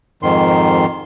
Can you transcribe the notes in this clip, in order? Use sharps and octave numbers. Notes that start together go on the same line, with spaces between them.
F2 G#2 D#3 C6